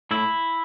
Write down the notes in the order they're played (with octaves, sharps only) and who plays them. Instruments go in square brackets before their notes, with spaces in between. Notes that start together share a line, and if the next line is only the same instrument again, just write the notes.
[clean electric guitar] A2 E4